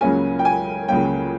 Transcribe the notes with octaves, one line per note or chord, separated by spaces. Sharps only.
C#2 C#3 F#3 A#3 C#4 G#5
G5
G#5
C#2 C#3 F#3 A#3 C#4 G5